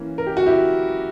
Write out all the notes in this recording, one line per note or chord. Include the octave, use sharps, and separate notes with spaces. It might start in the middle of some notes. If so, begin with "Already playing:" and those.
Already playing: E3 A#3 C#4
A#4
G4
F#4
E4 G4